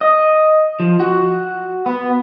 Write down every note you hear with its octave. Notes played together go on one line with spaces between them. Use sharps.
D#5
F3
F#4
B3